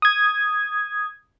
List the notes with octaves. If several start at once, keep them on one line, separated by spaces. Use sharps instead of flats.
D#6 G#6